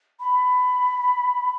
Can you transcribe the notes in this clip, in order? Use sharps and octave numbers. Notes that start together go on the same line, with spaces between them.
B5